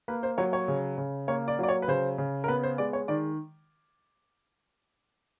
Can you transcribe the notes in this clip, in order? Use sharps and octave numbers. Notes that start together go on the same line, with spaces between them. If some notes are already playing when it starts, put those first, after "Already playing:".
A#3 B4
C5
F#3 C#5
C#5
C#3
C#3
A#3 C#5
D5
F#3 D5
C#5
B4
C#3 C5
C#3
A#4
B3 B4
C5
G#3 D5
C#5
D#3 D5